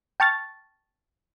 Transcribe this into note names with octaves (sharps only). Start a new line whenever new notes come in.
G5 A5 C#6 F6 A6